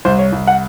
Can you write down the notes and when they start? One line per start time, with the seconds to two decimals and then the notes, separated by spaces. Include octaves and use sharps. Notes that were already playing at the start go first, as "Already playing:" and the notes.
0.05 C2 C5
0.18 C#5
0.33 C2
0.47 F#5